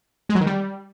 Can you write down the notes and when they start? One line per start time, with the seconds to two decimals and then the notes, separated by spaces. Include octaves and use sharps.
0.29 G#3
0.35 F#3
0.41 D#3
0.46 G3